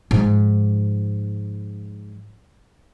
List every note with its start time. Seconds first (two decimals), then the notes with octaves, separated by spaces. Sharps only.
0.11 G#2 F3